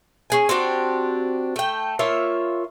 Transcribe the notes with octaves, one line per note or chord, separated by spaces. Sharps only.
C#4 G#4 G#5
C4 D4 F#4 G4
A3 G5
A#3 F4 C#5 E5